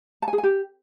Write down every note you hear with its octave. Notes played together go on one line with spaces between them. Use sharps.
A5
G#5
G#4
G#5
G4